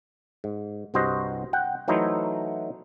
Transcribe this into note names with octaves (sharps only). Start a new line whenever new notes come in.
G#2
C2 G2 F#4 C5 D#5
F#5 G5
E3 F#3 A3 D#4 E4 C5